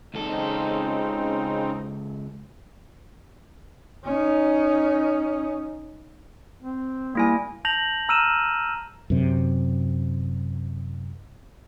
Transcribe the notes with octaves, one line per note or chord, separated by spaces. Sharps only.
C#2 C#3 C4 D#4 A4
C#4 D#4
C4
G3 A#3 E4 G#5
A5 G6 A#6 F7 F#7
A#5 E6 F6 D#7 E7
F#2 C3